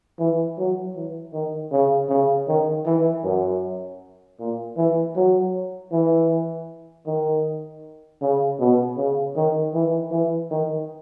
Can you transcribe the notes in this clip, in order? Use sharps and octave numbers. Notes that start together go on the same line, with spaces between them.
E3
F#3
E3
D#3
C#3
C#3
D#3
E3
F#2
A#2
E3
F#3
E3
D#3
C#3
B2
C#3
D#3
E3
E3
D#3